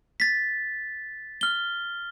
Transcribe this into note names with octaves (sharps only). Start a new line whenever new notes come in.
A6 B6
F6 G7